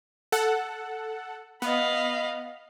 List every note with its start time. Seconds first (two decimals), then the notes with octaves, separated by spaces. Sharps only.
0.32 A4 F#5
1.62 B3 D#5 F5 B5